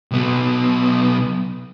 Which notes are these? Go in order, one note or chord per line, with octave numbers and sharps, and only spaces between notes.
B1 B3